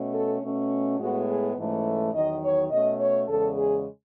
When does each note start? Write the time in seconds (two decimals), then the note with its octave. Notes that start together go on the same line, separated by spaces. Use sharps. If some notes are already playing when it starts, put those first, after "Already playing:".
Already playing: B2 A3 C#4
0.14 A4
0.42 B2 A3 C#4
0.99 A2 G#3 B3 F#4
1.27 G#4
1.57 G#2 E3 A3 C#4
2.13 E2 D#3 F#3 D#5
2.42 C#5
2.70 B2 A3 C#4 D#5
3.00 C#5
3.27 E2 C#3 G#3 A4
3.56 G#4